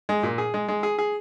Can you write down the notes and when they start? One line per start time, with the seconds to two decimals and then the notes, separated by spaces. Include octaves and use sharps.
0.09 G#3
0.23 A#2
0.38 G#4
0.54 G#3
0.68 G#3
0.83 G#4
0.98 G#4